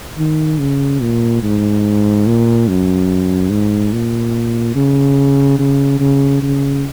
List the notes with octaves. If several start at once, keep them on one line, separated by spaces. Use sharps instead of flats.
D#3
C#3
A#2
G#2
A#2
F#2
G#2
A#2
C#3
C#3
C#3
C#3